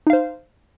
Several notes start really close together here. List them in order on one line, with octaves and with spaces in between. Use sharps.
D#4 F5 C5